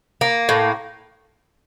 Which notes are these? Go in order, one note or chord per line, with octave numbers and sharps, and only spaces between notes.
A#3
A2